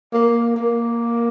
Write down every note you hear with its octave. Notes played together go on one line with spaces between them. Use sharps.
A#3
A#3